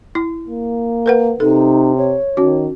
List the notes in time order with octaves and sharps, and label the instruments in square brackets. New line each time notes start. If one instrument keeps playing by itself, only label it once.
[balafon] E4
[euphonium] A#3
[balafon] A#4 B4 F#5
[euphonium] C3 [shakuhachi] D#4 [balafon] A4
[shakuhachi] C#5
[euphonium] D#3 [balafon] C#4 F#4